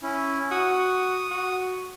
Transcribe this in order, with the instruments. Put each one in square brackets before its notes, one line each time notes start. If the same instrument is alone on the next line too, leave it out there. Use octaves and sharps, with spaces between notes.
[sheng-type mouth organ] C#4 E4
[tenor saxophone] F#4 [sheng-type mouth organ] D#6
[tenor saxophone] F#4